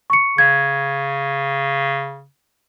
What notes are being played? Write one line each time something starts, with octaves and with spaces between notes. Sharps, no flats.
C#6 C#7
C#3 G#6